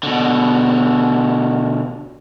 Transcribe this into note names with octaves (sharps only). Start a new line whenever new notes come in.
B2 D3